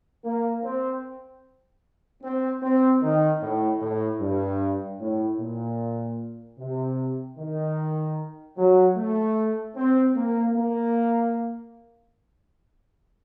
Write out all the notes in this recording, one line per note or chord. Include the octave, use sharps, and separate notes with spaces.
A#3
C4
C4
C4
D#3
A2
A2
G2
A2
A#2
C3
D#3
F#3
A3
C4
A#3
A#3